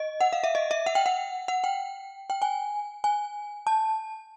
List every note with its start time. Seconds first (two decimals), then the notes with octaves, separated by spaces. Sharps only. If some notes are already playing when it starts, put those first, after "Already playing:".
Already playing: D#5
0.21 F#5
0.33 F5
0.44 E5
0.55 D#5
0.71 E5
0.86 F#5
0.95 G5
1.06 F#5
1.48 F#5
1.64 G5
2.30 G5
2.42 G#5
3.04 G#5
3.67 A5